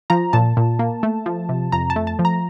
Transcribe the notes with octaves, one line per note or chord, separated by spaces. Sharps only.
F3 A#5
A#2 A5
A#2
A#3
A3
F3
C3
F2 A#5
A5
A3
A5
F3
A#5